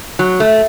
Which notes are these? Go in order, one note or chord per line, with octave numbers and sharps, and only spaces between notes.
F#3
A3